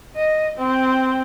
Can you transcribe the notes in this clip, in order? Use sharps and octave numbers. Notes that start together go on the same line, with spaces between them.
D#5
C4